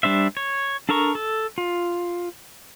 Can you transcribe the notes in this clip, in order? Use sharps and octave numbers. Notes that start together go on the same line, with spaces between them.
G3 D4 C5 E5
C#5
D4 A4 A#4 A#5 C#6
A4
F4